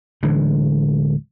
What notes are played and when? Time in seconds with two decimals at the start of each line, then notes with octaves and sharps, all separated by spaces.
0.23 D1 D3 E3 G#3